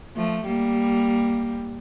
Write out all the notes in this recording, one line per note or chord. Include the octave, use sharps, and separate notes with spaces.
F3 A3
G3 A#3